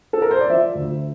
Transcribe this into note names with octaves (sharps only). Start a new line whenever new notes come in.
A4
A#4
C5
D5
F3 E5
D2